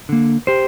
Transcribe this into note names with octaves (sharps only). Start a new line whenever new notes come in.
D3 A#3
G4 C5